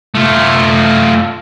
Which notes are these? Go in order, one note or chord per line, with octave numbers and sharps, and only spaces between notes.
A3 F4